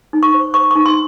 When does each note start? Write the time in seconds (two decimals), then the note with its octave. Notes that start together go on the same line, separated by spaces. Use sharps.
0.13 D#4
0.23 C#6
0.34 C5
0.54 C5 C#6
0.71 D#4 C#6
0.86 C6